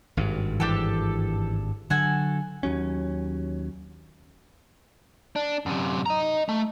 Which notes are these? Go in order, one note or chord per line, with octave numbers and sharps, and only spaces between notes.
G#1 G2
E3 D4 G4 A4
D3 F#3 F#4 A4 G#5
D#2 F#3 C#4
D4
F#2 C3
D#5 A#5
A3